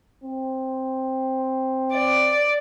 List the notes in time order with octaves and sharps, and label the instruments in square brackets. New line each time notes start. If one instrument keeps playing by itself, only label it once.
[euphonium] C4
[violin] D5